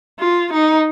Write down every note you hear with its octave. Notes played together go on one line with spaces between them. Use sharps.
F4
D#4